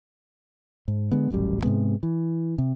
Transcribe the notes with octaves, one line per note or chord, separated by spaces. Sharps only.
G#2
D3 G#3 B3
D#1 A1 F#2 G3
G#2 C3 G#3 B3
E3
C3